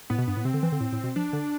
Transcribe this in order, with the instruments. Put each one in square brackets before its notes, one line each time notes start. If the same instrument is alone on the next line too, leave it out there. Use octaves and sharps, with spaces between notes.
[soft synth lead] A2 [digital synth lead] B3
[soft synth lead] B2
[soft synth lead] G2 [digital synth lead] B3
[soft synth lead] A2
[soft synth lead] C3 [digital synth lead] C4
[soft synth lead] D3
E3
D3
A2
A2
B2
[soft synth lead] F3 [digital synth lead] D4
[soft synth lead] D3